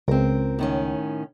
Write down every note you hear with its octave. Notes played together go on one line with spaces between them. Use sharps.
C#2 C4 A#4
A2 D#3 C#4